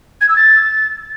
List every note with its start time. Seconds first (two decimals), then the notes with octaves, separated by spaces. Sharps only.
0.20 G#6
0.28 E6
0.36 A6